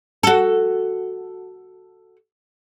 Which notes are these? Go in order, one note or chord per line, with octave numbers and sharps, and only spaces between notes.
F#4 A4